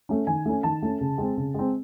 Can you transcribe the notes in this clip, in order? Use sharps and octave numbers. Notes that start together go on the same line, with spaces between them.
A3 C#4
D#3 G#5
A3 C#4
D#3 A5
A3 C#4
C#3
G#3 C4
C#3
G#3 C4